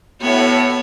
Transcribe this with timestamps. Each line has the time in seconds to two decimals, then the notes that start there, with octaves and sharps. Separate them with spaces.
0.22 A2 B3 F#4 C#5